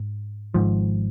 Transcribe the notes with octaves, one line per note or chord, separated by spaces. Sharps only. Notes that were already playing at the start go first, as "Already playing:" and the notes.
Already playing: G#2
G#1 G#2 F3